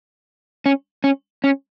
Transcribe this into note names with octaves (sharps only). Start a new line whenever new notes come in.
C#4
C#4
C#4